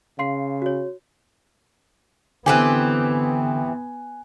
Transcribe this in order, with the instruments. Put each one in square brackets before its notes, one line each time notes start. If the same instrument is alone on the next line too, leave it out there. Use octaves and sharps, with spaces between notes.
[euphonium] C#3 [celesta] F5 C6 C7
[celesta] F#4 C#5
[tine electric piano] D3 [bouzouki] E3 C4 G4 [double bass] B3 [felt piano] G#5 F#6